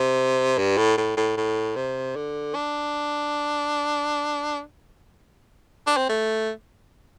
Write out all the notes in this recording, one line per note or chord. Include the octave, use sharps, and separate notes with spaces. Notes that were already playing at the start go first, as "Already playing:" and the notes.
Already playing: C3
G2
A2
A2
A2
A2
C3
D3
D4
D4
C4
A3